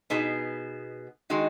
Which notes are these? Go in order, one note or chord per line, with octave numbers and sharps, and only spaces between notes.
B2 B3 D#4 G#4
D#3 G#3 D#4 F#4